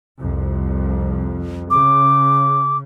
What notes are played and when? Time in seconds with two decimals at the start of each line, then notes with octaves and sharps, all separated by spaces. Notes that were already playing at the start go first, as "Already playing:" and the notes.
0.21 C2 F2
1.71 C#3 D6